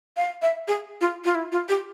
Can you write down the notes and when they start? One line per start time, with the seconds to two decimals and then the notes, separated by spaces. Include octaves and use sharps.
0.17 F5
0.42 E5
0.68 G#4
1.01 F4
1.25 F4
1.35 E4
1.52 F4
1.69 G4